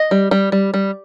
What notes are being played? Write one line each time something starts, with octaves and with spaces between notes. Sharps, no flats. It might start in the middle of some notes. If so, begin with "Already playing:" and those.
Already playing: D#5
G3
G3
G3
G3